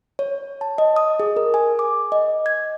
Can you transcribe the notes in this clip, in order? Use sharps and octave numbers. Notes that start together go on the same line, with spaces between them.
C#5
A5
D#5
D#6
G#4
A#4
G#5
D6
D#5
G#6